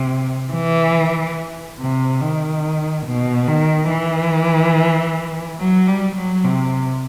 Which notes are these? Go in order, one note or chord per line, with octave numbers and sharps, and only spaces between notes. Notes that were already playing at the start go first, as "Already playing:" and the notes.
Already playing: C3
E3
C3
D#3
B2
D#3
E3
F#3
G3
F#3
C3